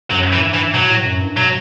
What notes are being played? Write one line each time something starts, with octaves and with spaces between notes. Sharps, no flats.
F#2 F#3
E3
A2
G2
E3
B2 F#3
A2
F#2
G2
B2 F#3